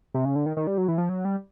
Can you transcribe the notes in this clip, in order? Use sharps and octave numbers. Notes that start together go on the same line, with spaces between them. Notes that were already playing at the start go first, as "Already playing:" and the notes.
C3
C#3
D3
D#3
D#3
G3
F#3
E3
F3
F#3
G3